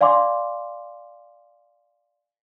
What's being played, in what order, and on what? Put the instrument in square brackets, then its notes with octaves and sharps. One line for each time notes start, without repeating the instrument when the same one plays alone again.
[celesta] D5 F5 G#5 C6 D6